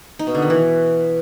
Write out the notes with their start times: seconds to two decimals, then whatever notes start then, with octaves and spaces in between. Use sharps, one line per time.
0.19 D#4
0.27 B2
0.35 D3
0.42 D#3
0.50 E3